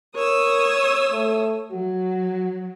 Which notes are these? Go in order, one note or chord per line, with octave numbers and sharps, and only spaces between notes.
A#4 C#5 D#6 E6
A3
F#3 F#4